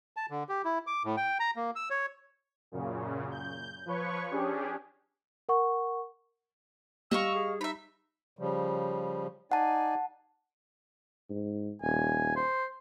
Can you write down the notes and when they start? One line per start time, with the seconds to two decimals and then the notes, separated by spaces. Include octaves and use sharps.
0.17 A5
0.30 D3
0.49 G4
0.65 E4
0.87 D6
1.05 A2
1.17 G5
1.40 A#5
1.56 A#3
1.76 E6
1.90 C#5
2.72 F#2 A#2 C#3
3.31 G6
3.86 F3 B4 C#5 C#6
4.30 C#4 D4 G4 G#4
5.49 A#4 F#5 C#6
7.11 G3 D#5 F5 C#6 E6
7.35 G#4
7.61 D#4 E5 B5
8.39 C#3 F3 G3
9.52 D#4 D5 F#5 G#5 A5
11.30 G#2
11.82 D#1 G#5
12.36 C5